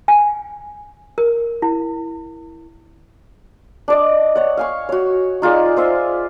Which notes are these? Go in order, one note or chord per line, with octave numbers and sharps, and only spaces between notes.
G#5
A#4
E4
D4 D5 D#5
C#5 F#5
F5 G#5 C#6
F#4 C#5
D#4 F4 G#4 D5
F4 C5 E5